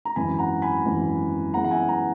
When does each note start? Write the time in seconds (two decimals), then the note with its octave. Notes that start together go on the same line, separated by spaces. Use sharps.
0.05 A#5
0.16 G#1 F#2 E3 G#5 B5
0.39 F#5 A#5
0.62 G#5 B5
0.85 G#1 F#2 E3
1.54 F#2 E3 G#3 B3 F#5 A#5
1.64 F#5
1.71 E5 G#5
1.89 F#5 A#5